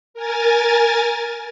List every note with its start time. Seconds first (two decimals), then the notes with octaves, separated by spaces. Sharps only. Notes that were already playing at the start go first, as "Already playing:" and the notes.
0.14 A#4 G#5 A6